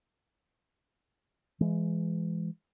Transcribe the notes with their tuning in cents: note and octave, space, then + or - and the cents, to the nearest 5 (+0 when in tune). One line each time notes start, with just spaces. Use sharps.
E3 +30 G#3 +0